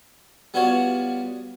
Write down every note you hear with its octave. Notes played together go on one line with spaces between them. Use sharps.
G3 B3 F4 F#4 C#5